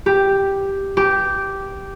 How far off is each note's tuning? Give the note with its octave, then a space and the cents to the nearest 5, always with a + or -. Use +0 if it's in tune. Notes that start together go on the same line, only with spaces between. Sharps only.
G4 +0
G4 -10